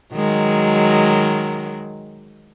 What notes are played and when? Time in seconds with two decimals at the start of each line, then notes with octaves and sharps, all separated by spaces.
0.14 D#3 F#3 G#3